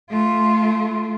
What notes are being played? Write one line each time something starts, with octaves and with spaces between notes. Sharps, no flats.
A3 F4